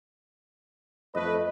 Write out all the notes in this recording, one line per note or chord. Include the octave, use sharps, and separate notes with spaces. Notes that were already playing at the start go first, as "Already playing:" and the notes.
F2 A3 B4 D#5